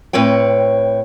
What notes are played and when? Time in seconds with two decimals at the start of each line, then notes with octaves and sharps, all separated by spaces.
0.13 A2 C4 B4 C#5 G5